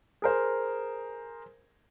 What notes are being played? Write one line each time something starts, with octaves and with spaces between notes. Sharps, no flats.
G#4 A#4 C5